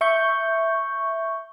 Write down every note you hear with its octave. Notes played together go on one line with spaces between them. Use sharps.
E5 C#6 G6